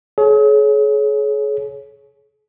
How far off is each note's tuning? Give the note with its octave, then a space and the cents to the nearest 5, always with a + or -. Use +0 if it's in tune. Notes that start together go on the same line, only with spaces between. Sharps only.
G#4 +40 C#5 +0